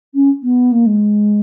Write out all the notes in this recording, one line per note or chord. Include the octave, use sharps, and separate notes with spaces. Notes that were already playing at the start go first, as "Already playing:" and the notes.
C#4
B3
A#3
G#3